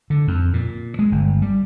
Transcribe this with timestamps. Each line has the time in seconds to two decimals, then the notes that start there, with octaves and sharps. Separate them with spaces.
0.10 D3
0.28 F2
0.53 A#2
0.99 G#3
1.12 G1
1.42 G3